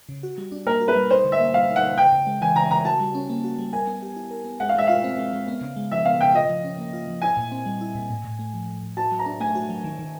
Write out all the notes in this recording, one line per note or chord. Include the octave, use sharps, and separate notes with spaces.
C#3
F#4
G3
D4
A#3 A#4
F#4
B4
G3
D#4 C5
D3
E5
A#3
G3 F5
D#4
F#5
D3
C#3 G5
C#3
G#3
E3 G#5
C#3 A#5
C#3 A#5
F#4 A5
G3
C#4
A#3
F#4
G3
A#4 G#5
B3
G4
E4
A#4
B3
G#3 F#5
F5
G#3 E5
F4 F5
C4
G#3
G#3
B3
C#3
G#3
F3 E5
B3 F5
C#3 G5
F4 D#5
F3
C#4
A#3
F4
F3
E4 G#5
A#2
C4
G3
E4
A#2
A2
A2
A3
F3
A2
A2
F#4 A5
F#3
A#5
D4
A3 G#5
F#4
F#3
D#3
D#3